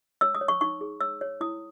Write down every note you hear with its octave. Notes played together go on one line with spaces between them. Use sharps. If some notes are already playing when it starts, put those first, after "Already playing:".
C#5 E6
D#6
C#5
C#6
D#4 C#6
G#4
C#5 E6
C#5
E4 D#6